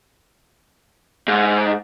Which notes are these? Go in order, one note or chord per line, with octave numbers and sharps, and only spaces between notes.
G#2